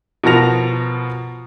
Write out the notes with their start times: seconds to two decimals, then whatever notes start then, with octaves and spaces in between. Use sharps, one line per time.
0.24 B2 F3 A#4 A5 A#6 F7